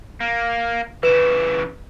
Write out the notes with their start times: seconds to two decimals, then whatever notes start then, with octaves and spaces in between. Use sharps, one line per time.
0.20 A#3
1.03 C#3 E3 B4 E7